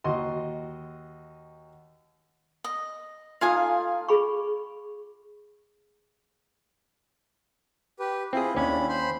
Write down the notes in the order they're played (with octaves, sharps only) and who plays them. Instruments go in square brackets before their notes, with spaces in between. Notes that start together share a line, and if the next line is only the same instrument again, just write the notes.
[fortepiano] D#2 F#4 D#5 C6
[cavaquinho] D#5
[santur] A3 D#4 F4 [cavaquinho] F5 G#5 D#6
[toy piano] G#4 B5 C#6
[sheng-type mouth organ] G4 B4
[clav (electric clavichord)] C4 G#4 [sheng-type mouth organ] E4 F4
[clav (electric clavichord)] D#2 C#4 [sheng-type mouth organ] D4 E4 B5
[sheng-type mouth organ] C5 B5 C6